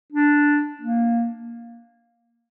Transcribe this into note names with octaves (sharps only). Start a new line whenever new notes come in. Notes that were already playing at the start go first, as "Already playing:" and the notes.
D4
A#3